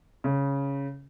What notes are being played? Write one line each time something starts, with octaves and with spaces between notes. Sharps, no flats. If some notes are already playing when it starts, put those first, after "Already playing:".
C#3